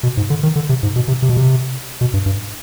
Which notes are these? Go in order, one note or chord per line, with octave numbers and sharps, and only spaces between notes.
B2
G#2
D3
D#3
D3
C3
G#2
B2
C3
C3
B2
C3
B2
G2
G2